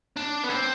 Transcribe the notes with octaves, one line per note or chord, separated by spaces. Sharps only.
D4
B3
C4